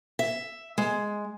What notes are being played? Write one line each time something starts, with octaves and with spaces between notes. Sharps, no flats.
E5
G#3